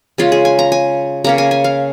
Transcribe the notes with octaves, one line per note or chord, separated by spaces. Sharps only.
C#3 G#3 C#4 F4
G#4
G#5
A#5
G#5
C#3 A#3 C#4 A#5
G#5
G#5
F5